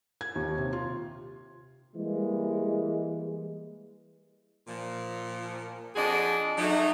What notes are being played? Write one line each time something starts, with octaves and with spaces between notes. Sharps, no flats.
G#6
D#2
C3
F4
E3 G3 G#3 A#3
A#2 F3
F2 F3 D4 F#4 G#4 D#5
F#3 A3 D#4